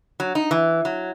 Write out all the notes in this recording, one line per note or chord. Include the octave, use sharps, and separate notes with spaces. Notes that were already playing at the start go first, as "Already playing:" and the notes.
F#3
D#4
E3
F#3